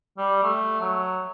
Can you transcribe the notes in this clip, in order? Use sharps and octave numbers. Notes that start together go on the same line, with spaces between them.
G3
A3
F#3